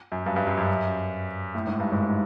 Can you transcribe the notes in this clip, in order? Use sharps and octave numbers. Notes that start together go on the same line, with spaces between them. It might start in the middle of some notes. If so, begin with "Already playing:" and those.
F#2
G2
G2
F#2
F#2
A2
G#2
G2
G#1 G#2